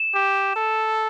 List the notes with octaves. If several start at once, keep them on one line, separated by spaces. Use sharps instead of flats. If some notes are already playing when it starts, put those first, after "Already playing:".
Already playing: E7
G4
A4